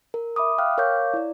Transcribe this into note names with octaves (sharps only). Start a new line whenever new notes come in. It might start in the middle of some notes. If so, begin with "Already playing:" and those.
A#4
E5 B5 D6 D#6
F5 G5 F6 F#6
A#4 C#5 F5 C#6 D6 G6
E4 D5